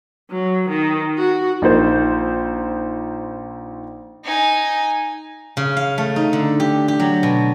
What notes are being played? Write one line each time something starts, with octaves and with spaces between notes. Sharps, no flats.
F#3
D#3
F#4
A#1 D#4 C5
D#4 G#5
C#3
F5
A3
D#4
D3
G4
G4
F#3
B2